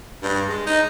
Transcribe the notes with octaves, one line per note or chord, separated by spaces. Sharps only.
G2
G#3
D#4